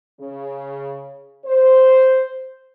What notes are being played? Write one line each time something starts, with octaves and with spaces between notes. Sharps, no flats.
C#3
C5